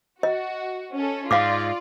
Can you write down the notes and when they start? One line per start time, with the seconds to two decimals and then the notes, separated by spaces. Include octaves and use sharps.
0.23 F#4 D#5
0.93 C#4 A4
1.31 G#2 F4 D5 F5 D6